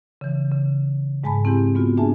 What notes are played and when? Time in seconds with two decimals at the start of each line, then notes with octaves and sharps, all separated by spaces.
0.21 C#3 E3
0.51 C#3
1.24 G#2 G#3 G#5 A5 B5
1.45 C4 E4 G4 G#5
1.75 G#3 B3 F4 F#4
1.97 A#3 D4 G#4 E5 G#5 A5